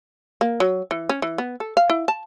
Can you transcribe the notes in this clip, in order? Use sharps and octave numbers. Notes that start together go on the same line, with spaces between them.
A#3
F#3
E3
C#4
E3
B3
A4
F5
E4
A5